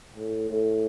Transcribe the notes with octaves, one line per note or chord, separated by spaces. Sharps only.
A2
A2